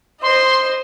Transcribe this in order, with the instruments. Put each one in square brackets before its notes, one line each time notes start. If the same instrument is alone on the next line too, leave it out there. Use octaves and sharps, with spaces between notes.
[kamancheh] C5 D#5 [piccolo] C6